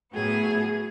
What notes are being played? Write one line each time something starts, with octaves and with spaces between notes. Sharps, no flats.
A2 F#3 B3 G#4